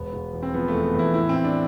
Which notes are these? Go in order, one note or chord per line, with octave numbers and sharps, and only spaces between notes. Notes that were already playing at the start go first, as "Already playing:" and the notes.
Already playing: E1 B3
E1
E2
C4
F3 B3
A3
E2
B3
E2 E4
A2 E4
C4
A2
D4